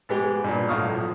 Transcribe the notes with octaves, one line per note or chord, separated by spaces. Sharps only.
G#2 G#3 B3 G4
G2 A#2
B1 A2 F5 C#6 D#6 F6
F3